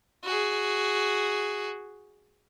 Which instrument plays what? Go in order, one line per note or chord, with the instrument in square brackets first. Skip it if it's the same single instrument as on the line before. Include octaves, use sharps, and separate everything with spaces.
[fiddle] F#4 G#4